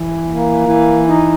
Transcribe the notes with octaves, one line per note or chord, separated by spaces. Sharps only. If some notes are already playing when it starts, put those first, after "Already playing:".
Already playing: E3
A#3
E3
D#4